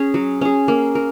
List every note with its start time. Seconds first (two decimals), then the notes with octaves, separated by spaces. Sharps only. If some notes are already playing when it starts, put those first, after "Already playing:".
Already playing: C#4 G#4
0.14 F#3
0.41 C#4 G#4
0.68 A#3
0.95 A#4